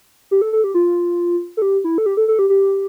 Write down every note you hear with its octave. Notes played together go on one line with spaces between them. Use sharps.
G4
A4
A4
G4
F4
A4
G4
E4
A4
G4
A4
A4
G4
G4